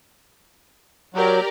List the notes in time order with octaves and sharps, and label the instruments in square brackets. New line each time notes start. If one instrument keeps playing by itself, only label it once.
[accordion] F#3 [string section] G4 A#4 D5